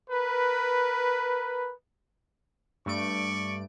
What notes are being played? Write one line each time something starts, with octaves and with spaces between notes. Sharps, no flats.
A#4 B4
G2 A3 D5 C#6 D7